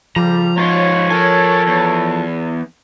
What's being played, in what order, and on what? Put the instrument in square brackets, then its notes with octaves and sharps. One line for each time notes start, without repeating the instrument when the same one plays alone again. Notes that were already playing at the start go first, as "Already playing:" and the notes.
[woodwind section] F2 C#3 G3 [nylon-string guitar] F3 [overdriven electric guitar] A#5
[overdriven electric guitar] G#2 F4 [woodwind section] C#5
[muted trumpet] A4 [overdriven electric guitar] A#4 G#5
[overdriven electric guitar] E2